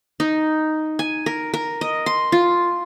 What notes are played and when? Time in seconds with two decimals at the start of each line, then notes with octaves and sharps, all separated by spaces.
0.20 D#4
0.99 G#5
1.26 A#4
1.54 A#4
1.81 D#5
2.06 C6
2.32 F4